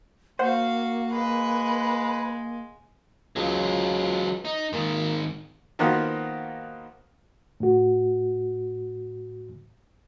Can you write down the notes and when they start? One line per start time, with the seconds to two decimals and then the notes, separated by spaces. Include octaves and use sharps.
0.39 A#3 F#4 C5 F5 F#5
1.12 G#3 B4
3.36 C#2 F#3 F4
4.45 D#4
4.73 G#2 D#3 A#3
5.79 D#3 F3 A#3 B3 F4 F#4
7.60 A2 F#4